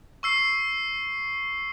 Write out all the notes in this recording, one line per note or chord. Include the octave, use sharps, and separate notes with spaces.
C#6 E6 C7